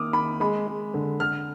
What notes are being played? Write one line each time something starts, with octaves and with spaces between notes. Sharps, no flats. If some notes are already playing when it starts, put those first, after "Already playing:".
Already playing: D#3 A#3 D6 D#6 F6
D#3 B5
G#3 B5
G#3
D3
D3 F6